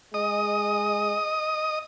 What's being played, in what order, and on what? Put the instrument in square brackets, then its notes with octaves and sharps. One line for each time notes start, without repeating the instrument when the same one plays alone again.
[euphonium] G#3 [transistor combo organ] D#5 D#6